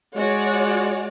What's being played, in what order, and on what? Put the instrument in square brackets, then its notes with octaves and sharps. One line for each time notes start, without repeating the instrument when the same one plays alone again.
[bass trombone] G#3 [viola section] F#4 C#5 D5